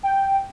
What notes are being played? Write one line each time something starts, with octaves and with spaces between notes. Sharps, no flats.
G5